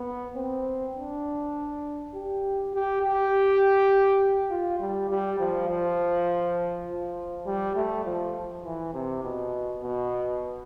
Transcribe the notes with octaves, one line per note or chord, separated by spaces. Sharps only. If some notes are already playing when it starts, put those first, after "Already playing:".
Already playing: B3
C4
D4
G4
G4
G4
F4
G3
G3
F3
F3
F3
G3
A3
F3
E3
C3
B2
B2